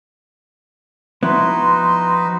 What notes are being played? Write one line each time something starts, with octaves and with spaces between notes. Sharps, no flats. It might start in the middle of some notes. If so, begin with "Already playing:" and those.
F3 B3 D#4 E4 F#4 B4 C6